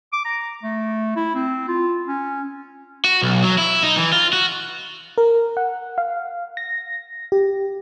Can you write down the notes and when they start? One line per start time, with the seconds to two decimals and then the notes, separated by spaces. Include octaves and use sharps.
0.13 D6
0.25 A#5
0.63 A3
1.16 E4
1.35 C4
1.68 F4
2.08 C#4
3.04 F#4
3.22 B1
3.44 F#3
3.58 E4
3.83 D#4
3.97 E3
4.12 F4
4.33 F#4
5.18 A#4
5.57 F#5
5.98 F5
6.57 A#6
7.32 G4